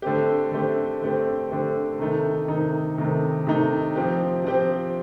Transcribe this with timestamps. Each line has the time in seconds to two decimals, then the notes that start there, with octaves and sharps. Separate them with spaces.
0.02 D3 A3 C4 G4
0.51 D3 A3 C4 G4
1.02 D3 A3 C4 G4
1.50 D3 A3 C4 G4
1.99 C3 D#3 A3 D#4
2.48 C3 D#3 A3 D#4
2.98 C3 D#3 A3 D#4
3.47 C3 D#3 A3 D#4
3.96 F3 C4 G4
4.44 F3 C4 G4